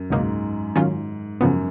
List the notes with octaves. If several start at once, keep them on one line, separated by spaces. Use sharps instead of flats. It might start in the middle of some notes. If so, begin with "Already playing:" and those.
Already playing: F#2
C#2 G#2 B2 F#3 A#3 D#4
D#3 F#3 C#4 F4
F#2 C#3 F3 B3